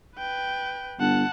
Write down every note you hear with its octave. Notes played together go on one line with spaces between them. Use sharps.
B4 G5
G1 F#5 A5